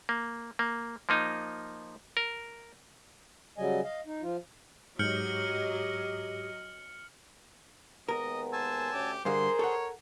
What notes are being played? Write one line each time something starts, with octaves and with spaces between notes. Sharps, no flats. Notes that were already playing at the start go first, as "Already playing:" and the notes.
A#3
A#3
F3 A#3 D#4
A#4
C#3 F#3 G3 D#5 G#5
D#5 F5
D#4
F3 F4
G#2 F#3 G4 D#5 F6 G6 C#7 F#7
D#2 G#3 B3 A#4 D#5
C5 G#5 A5 E6
D2 C#4 G4
G2 D3 G#4 A#4 C5 F5 C6
A4 C#5 F#5